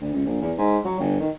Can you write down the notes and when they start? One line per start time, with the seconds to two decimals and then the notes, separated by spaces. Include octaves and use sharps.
0.01 D2
0.14 C#2
0.26 A#1
0.41 E2
0.58 G#2
0.85 F#3
1.00 G1
1.20 D#3